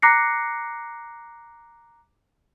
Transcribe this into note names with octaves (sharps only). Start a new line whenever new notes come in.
A#5 D6 F#6 A#6 C7 C#7